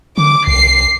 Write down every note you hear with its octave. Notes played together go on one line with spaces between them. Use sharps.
D3 D6
C2 C7